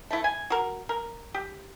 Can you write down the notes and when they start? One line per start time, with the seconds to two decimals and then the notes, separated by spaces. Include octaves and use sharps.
0.11 A3 E4
0.24 G#5
0.50 F#4 A#4
0.89 A#4
1.34 G4